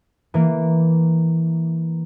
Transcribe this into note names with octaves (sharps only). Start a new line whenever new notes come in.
E3 A#3